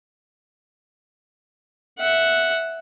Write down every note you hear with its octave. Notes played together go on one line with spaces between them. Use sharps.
E5 F#5